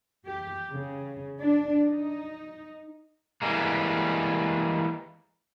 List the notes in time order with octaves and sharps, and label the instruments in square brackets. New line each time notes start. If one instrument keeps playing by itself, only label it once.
[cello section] G4
C#3
D4
D#4
[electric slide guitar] E3 G3 G#3 A#3